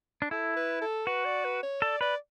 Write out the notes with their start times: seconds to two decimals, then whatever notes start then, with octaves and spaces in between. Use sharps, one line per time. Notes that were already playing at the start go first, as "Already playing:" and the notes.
0.22 D4
0.31 E4 A4
0.56 B4
0.82 A4
1.07 F#4 B4
1.25 D5
1.45 B4
1.63 C#5
1.82 A4 D5
2.01 B4 D5